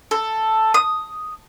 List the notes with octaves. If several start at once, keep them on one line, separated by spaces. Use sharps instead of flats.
A4
D#6